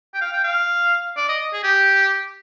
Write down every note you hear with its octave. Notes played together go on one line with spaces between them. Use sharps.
G5
F5
G5
F5
D5
D#5
G#4
G4